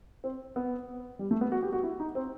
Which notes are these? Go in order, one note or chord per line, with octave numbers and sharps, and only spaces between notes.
C4
B3
G3
A3
B3
F#4
G4
F#4
E4
D#4
C4